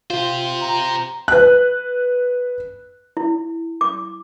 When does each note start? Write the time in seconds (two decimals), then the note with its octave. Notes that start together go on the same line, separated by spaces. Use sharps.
0.10 F4 G4 C5
0.61 A#5
1.28 B4 F#6
3.17 E4
3.81 D6